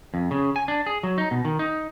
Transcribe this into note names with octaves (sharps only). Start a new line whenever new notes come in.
F2
C#3
G#5
D4
G#4
F#3
D#4
B2
D#3
D#4